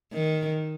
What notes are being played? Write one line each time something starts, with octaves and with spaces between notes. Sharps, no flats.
D#3